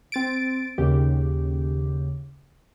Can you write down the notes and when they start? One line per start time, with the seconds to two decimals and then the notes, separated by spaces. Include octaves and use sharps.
0.12 C4 A6 D7
0.78 D#2 C#3 G4